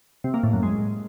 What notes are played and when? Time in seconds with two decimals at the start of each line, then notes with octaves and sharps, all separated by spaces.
0.24 C3
0.34 A#3
0.44 A2
0.53 F#2
0.63 G#3